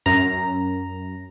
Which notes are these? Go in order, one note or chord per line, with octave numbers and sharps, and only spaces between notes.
F#2 A#5